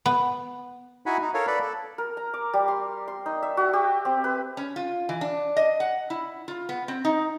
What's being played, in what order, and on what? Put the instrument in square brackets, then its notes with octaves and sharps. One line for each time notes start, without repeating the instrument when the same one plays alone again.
[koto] B3
[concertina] D#4 E4 F#4 F#5 G#5 B5
D#4
A4 A#4 C#5 F5
A4 B4 D5 B5
A4
[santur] A#4
A#5
D6
G3
C6
C6
D#4
E5
F#4
G4
C4
B4
[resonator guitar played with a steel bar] C#4
F4
E3
D4
D#5
F#5
E4
F4
B3
C4
D#4